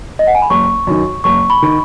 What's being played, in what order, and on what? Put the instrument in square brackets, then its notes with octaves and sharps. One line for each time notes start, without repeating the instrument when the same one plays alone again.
[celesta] D#5
F#5
G#5
B5
[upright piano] F#1 [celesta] C#6
[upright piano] F#2 D#3
[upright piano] F#1 [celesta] C#6
[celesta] B5
[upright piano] D#3